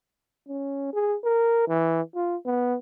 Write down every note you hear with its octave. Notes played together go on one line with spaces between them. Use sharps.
C#4
G#4
A#4
E3
F4
B3